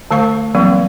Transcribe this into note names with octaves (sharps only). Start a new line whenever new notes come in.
D3 A3 C5 F5 C#6
E3 F#3 G3 A#3 C4